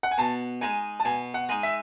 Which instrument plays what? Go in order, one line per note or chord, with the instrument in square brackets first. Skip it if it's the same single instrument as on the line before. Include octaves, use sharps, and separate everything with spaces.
[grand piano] F#5
G#5
[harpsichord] B2 [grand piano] A5
[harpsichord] G#3 D#4 [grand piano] G#5
[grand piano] A5
[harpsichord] B2 [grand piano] G#5
[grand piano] F#5
[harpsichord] G#3 D#4
[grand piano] E5